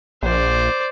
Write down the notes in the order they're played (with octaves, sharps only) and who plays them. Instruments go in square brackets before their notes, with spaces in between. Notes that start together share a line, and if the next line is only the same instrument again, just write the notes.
[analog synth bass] A#1 [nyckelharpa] C5 D5